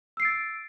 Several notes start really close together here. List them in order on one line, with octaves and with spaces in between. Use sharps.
E6 C7 D7 A6